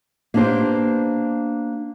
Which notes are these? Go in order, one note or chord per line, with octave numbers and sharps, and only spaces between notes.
A#3 B3 D4 G4 C5